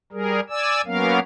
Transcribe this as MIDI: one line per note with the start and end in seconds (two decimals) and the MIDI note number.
0.12 0.40 55
0.12 0.40 68
0.12 0.40 70
0.50 0.81 74
0.50 0.81 80
0.50 0.81 88
0.86 1.20 54
0.86 1.20 58
0.86 1.20 59
0.86 1.20 61
0.86 1.20 70
0.86 1.20 77